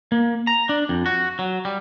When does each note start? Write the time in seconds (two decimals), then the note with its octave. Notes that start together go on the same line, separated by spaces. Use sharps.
0.12 A#3
0.47 A#5
0.69 D4
0.89 F2
1.06 F#4
1.39 F#3
1.65 G3